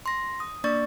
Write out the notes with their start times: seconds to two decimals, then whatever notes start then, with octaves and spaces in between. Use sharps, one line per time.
0.06 C6 A#6
0.40 D#6
0.64 A#3 D4 D5 C#6 A6